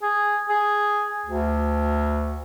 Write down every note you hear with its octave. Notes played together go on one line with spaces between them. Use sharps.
G#4
G#4
D2